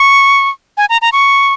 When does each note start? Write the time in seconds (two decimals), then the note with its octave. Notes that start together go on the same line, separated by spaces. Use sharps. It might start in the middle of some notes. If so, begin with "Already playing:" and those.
Already playing: C#6
0.77 G#5
0.89 A#5
1.02 A#5
1.12 C#6